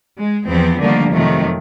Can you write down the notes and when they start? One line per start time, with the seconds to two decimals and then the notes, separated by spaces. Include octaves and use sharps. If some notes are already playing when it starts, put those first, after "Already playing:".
0.17 G#3
0.47 E2 F3 B3 C4
0.80 D3 D#3 F3 G3 A3 A#3
1.12 F2 C3 D#3 F#3 A3